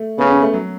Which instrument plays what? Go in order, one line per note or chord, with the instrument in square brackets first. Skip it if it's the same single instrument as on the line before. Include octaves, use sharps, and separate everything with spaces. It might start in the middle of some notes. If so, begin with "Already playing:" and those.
Already playing: [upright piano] A3
[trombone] C#3 [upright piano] B3
[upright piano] C#4
A3
F#3